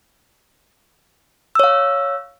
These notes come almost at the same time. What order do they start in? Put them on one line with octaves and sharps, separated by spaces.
E6 C#5 F5